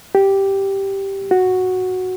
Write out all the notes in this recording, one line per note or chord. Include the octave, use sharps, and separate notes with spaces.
G4
F#4